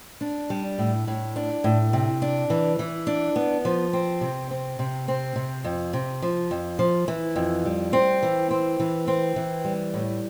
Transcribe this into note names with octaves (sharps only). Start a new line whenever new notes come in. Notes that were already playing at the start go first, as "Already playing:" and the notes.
D4
G3
A2
A2
D4
A2
C3
D4
E3
E3
D4
B3
F3
C4
C3
C4
C3
C4
C3
F2
C3
F3
F2
F3
E3
F2
G3
C4
E3
C4
E3
C4
E3
G3
A2